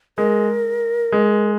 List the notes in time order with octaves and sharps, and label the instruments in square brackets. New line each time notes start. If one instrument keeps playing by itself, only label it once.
[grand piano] G#3 [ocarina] A#4
[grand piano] G#3